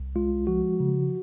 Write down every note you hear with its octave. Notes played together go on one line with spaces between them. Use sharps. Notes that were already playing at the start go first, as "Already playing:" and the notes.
Already playing: C2
G#3 F4
F3 F#4
C#3